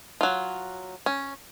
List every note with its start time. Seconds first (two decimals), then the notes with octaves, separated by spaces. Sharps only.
0.21 F#3 F4
1.06 C#4